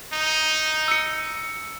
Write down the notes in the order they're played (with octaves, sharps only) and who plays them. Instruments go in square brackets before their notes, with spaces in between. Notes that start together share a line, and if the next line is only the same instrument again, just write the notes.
[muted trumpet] D#4
[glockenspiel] E6 C#7